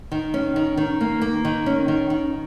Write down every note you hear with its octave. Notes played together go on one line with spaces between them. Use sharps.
D#3
C#4
D#3
D#3
A#3
A#3
D#3
C#4
D#3
D#3